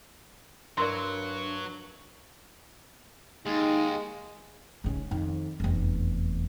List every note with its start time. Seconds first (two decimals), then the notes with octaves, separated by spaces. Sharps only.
0.78 G2 F#3 E4 A#4 D5 C6
3.46 D#2 G#3 D#4
4.84 G#2 C#3
5.11 F2 D#3
5.60 F1 E2